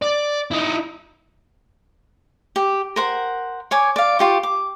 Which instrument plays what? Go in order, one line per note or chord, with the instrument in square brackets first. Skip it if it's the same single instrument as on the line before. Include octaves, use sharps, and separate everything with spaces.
[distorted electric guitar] D5
D#4 E4
[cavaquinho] G4
A#4 C5 F#5
C#5 G#5 D6
D5 F5
F4 G4 C#6
D6